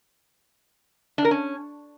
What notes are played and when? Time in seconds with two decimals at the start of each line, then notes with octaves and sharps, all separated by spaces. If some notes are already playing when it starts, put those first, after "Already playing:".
1.18 D4
1.25 A#4
1.31 C#4